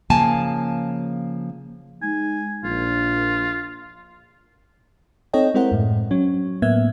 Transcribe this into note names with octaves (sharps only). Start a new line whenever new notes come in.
C#3 F3 A#3 G#5 A5
G#3 D#4 G#5
A#1 F4
C4 D#4 A4 C#5 D#5 G5
G#3 C4 E4 A#4 C5 F#5
F#2 A2
F#3 C#4
A2 A#3 B3 E5 G#6